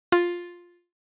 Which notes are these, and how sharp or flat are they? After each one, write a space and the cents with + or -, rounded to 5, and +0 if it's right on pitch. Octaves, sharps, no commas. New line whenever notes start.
F4 +5